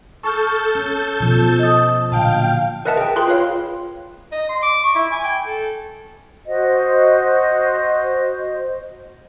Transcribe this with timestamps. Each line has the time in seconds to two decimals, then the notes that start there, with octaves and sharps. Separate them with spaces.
0.23 A4 A5 C#6 F6 G6
0.75 C#4
1.20 B2 F3
1.59 D#5 D#6
2.12 A#2 D3 F#3 F5 G5 A5
2.85 A#4 B4 D#5 E5 F#5 A5
2.97 G#4 G5
3.16 F4 G#4 B4 G5 B5 C6
3.28 F4 B4 C#5 F5
4.32 D#5
4.50 C6
4.63 D6
4.84 C#6
4.96 E4
5.12 G#5
5.24 G5
5.46 A4
6.47 F#4 C5 D#5